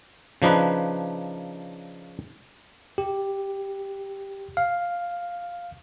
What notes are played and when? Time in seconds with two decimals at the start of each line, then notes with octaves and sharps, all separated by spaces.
0.42 C#3 F3 D4 D#4 B4
2.98 G4
4.57 F5